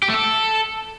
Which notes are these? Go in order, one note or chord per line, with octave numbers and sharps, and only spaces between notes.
G4
A3
A4